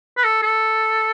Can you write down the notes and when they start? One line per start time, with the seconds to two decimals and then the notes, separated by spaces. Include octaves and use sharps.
0.17 B4
0.24 A4
0.42 A4